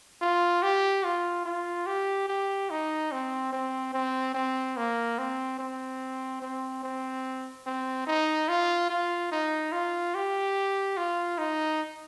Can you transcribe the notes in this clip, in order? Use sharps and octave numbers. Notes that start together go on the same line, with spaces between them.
F4
G4
F4
F4
G4
G4
D#4
C4
C4
C4
C4
A#3
C4
C4
C4
C4
C4
D#4
F4
F4
D#4
F4
G4
F4
D#4